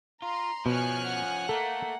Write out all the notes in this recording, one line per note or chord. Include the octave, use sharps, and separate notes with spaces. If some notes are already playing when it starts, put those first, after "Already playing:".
F4 A#5 C6
B2 F3 C#4 G#5 F6 F#6
F#5
A3 A#3 A4